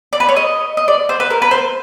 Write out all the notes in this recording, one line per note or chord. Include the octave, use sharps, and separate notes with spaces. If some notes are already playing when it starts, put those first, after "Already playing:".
D5
B4
C#5
D#5
D#5
D5
C5
B4
A#4
B4
C5